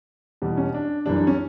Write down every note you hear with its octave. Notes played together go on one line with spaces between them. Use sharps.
E2 B2 G3
C#4
D4
F#2 E3 G3 D4
D4
C#4